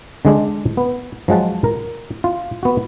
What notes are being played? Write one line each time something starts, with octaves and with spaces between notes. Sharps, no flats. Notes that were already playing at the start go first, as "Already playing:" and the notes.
D3 G#3 D4
B3
F3 F#3 G#3 F#5 A5
A#4
F4
B3 F#4